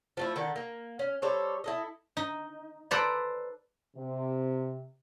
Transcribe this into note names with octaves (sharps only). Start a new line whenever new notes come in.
F3 A3 E4
D3 D#3 A4
A#3
C#4
G3 A4 C5 C#5
E4 A4 D#5
D#4
A4 B4 C5 D5 A#5 B5
C3